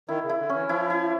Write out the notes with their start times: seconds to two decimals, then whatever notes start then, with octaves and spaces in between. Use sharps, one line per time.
0.09 D#3 E4
0.24 C#3
0.30 E4
0.39 D3
0.49 E3 C#4
0.69 F3 E4
0.90 E4